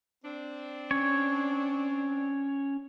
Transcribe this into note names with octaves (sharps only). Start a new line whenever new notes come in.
C4 D4
C#4 C#5